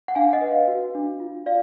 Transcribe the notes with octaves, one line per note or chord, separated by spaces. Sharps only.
F#5
D4 F5 G#5
D#5 F#5
B4
F5
F#4
D4
F4
D5 F5